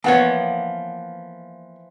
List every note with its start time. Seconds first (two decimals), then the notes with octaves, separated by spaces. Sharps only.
0.04 E3 F3 A#3 B3 C#5 F#5 G#5